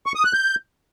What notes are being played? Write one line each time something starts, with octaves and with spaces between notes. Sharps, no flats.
C#6
D#6
F#6
G6